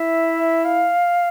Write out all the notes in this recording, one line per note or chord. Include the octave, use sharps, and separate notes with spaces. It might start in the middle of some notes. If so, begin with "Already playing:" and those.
Already playing: E4 E5
F5